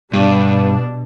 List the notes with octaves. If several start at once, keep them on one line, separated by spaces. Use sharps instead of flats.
G2 B2 G3 B3 D4